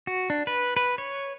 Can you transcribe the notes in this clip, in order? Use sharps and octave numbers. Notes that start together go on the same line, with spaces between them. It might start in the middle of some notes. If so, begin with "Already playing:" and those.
F#4
D4
B4
B4
C#5